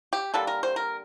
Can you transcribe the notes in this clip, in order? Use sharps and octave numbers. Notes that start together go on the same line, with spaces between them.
G4
D3 G3 A#3 A4
A#4
C5
A#4